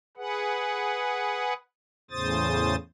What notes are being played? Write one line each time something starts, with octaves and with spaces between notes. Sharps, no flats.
G#4 B4 F#5
E2 A2 C#3 C5 D#6 A6